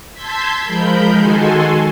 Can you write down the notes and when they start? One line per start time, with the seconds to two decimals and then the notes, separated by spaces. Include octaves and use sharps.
0.13 A5 C6 E6 G6 G#6 B6
0.62 F3 G#3 A#4 B5 G6
1.16 D#3 G#3 F#4 A4 G#5 C6